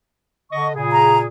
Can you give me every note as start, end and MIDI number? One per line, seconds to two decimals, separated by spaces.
0.51 0.68 50
0.51 0.68 75
0.51 0.68 85
0.75 1.28 46
0.75 1.28 49
0.75 1.28 68
0.92 1.18 82